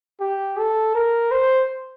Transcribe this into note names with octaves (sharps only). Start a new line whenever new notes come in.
G4
A4
A#4
C5